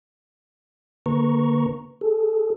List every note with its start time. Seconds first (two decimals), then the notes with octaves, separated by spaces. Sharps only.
1.06 D3 A#3 B4 A#5 C#6
2.01 G#4 A4